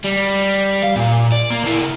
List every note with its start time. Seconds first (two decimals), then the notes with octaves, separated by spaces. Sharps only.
0.04 G3
0.83 F5
0.96 A#2
1.32 D5
1.50 A#3
1.64 A#3 E4